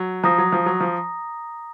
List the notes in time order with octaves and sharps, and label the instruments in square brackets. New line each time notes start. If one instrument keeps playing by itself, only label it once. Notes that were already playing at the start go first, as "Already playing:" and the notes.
Already playing: [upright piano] F#3
[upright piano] F3 [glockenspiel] A#5 D#6 A#6
[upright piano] F#3
F3
F#3
F3